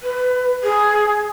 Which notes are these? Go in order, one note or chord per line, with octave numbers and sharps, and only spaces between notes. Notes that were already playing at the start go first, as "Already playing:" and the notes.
B4
G#4